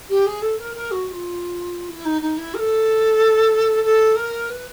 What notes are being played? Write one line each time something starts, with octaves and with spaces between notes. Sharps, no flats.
G4
G#4
A4
A#4
A#4
F#4
F#4
F4
E4
D#4
D#4
E4
A#4
A4
A4
A#4
B4